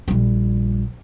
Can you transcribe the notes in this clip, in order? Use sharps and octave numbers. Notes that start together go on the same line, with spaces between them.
A#1 G3